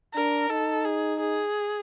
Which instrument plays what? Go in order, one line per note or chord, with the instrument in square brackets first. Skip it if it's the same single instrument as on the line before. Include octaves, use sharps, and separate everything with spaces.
[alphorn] D4 [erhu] A#4
[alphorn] D#4 [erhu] A4
[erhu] G#4
G#4